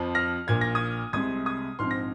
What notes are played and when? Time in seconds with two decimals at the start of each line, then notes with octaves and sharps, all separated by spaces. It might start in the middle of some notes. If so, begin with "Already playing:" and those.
Already playing: F2 F3 C4
0.15 F6 A#6
0.47 A#1 A#2 A#3 G#6
0.61 A#6
0.75 D#6 G#6
1.13 C2 C3 G#3 C4 D#6 G#6
1.46 D#6 G#6
1.79 A#1 G#2 F3 C4 C6 F6
1.91 A#6